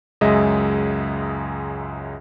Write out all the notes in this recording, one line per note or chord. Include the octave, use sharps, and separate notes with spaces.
C#2 F#2 G#3 G#4 D#5 E5